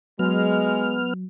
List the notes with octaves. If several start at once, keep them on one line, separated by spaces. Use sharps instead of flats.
F#3 G#3 B3 F6